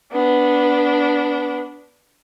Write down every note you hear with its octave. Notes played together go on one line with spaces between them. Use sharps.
B3 D4